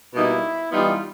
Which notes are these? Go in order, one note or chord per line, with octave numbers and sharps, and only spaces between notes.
B2 G3 A#3 D#4 E4
E3 G3 B3 D#4 F4